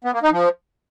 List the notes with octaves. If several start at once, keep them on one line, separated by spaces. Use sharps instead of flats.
B3
A#3
D#4
F3